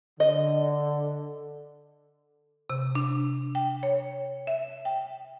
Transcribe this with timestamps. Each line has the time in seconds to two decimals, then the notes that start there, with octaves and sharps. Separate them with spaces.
0.20 D3 D#5
2.70 C3
2.95 D4
3.55 G5
3.83 C#5
4.47 E5
4.85 G5